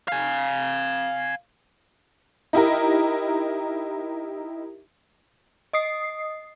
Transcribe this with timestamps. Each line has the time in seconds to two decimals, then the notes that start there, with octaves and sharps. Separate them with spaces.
0.08 F5 G#5
2.53 D#4 E4 G4 A#4
5.73 D#5 D#6 C7